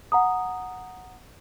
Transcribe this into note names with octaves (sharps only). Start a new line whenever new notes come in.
F#5 A#5 D#6